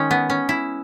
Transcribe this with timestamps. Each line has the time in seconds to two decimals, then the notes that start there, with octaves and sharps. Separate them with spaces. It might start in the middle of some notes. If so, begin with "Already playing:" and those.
Already playing: D#3 G#3 C#4 D#4
0.11 B3
0.30 C#4
0.49 E4